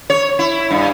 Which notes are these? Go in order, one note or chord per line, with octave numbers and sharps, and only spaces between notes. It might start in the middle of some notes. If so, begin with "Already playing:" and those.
C#5
E4
G2